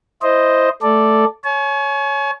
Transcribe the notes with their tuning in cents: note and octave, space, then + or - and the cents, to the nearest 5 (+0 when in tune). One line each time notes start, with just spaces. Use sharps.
E4 +0 C5 +0 D#5 +0
A3 +0 A4 +0 D5 +0
C#5 +0 G#5 +40